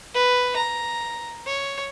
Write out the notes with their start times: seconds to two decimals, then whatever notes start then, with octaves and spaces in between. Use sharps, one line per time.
0.15 B4
0.56 A#5
1.46 C#5